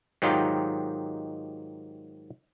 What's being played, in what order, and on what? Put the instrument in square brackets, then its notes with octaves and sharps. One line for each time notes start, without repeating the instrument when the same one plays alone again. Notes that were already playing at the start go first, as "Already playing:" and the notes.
[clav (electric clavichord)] G#2 D#3 F#3 D#4 F4 G4